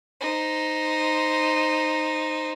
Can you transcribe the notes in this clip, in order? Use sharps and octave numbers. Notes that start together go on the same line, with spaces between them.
D#4 C5